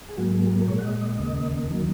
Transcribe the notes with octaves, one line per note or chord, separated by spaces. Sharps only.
G#4
G#2 F#3 A#3 F#4
G#4
G#4
A#4
A#4
A#2 G#3 C#5
F#5
D#5
D#5
D#2 C#3 A#3 D#5
D#2 D#3 F#3 A#3